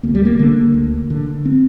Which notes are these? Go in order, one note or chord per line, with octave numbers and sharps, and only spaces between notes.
D2 A#3
G3
A#3
D3 A#3
D2
D3
C4